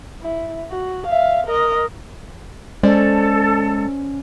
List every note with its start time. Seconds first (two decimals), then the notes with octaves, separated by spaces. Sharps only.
0.22 E4
0.71 F#4
1.07 E5 F5
1.46 A#4 D#5
2.83 G#3 C#4 A4 C5 D5